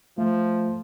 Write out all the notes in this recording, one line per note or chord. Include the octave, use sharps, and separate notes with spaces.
F3 A3